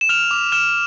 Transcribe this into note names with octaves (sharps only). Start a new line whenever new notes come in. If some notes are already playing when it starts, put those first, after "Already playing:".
E7
F6 F7
D6
F6 E7